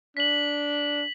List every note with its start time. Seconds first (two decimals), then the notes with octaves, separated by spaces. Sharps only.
0.17 D4 B6 F#7